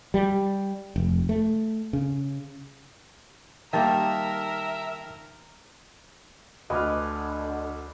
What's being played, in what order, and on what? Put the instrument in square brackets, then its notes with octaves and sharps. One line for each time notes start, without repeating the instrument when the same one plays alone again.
[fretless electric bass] G3
F1
A3
C#3
[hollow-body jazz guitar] D#3 G3 A#3 [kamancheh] A#4 [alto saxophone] E5 [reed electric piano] G5 A5
[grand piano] D2 F6 [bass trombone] D3 [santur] B4 G#5 D6 [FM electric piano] D#5